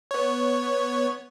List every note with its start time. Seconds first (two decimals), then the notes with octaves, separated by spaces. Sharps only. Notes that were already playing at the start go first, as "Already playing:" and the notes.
0.11 B3 C#5